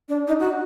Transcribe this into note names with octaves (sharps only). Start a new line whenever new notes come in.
D4
D#4
F#4